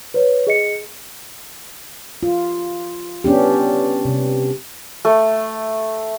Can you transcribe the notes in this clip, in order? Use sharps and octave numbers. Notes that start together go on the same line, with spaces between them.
B4 C#5
G#4 D#5 C#7
F4
B3 C#4 D4 G4
C3
A3